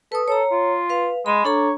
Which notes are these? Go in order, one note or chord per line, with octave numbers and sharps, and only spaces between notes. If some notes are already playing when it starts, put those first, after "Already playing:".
A4 B4 D#6
A4 C#5 A#5
F4
B4 F5
G#3 B5
D4 A4 C#5 A#5